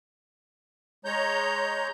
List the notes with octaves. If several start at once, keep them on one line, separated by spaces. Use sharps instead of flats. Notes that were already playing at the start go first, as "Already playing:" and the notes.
G#3 C#5 A#5 G6